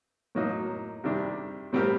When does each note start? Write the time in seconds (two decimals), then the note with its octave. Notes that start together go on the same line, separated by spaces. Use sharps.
0.35 A2 F#3 A#3 D#4
1.04 C3 D#3 G3 D4
1.73 A2 G3 C4 G4 A#4